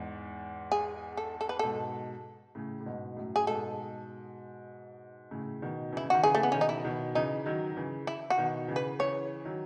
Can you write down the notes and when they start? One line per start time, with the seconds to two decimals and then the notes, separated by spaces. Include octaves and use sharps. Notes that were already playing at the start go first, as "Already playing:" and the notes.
Already playing: E2 G#2
0.72 G#4
1.17 A4
1.41 A4
1.49 B4
1.59 G#2 B2 A4
2.55 A2 C#3
2.80 A2
2.86 G#2 B2
3.17 F#2 A2
3.36 G#4
3.47 G#2 B2 A4
5.31 A2 C#3
5.62 B2 D#3
5.92 C#3 E3 E4
6.04 C#3
6.10 D#3 F#4
6.23 C#3 E3 G#4
6.35 A3
6.43 B3
6.52 B2 D#3 C#4
6.61 D#4
6.69 E4
6.85 B2 D#3
7.15 C#3 E3 D#4
7.46 D#3 F#3
7.71 F#3
7.77 C#3 E3
8.07 E4
8.30 F#4
8.38 B2 D#3
8.68 C#3 E3
8.76 B4
8.99 C#3 E3 C#5
9.45 D#3 F#3